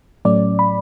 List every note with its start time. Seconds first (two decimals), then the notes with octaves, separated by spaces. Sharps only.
0.25 A2 F#3 A3 C#4 D5
0.59 B5